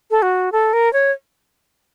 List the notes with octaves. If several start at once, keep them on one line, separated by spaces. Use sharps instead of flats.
A4
F#4
A4
A#4
C#5